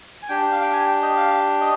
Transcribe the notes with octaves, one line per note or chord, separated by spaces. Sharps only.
G#5
D4 G4 G5
F5
G5
G#5
G5
D#5
F5
D#5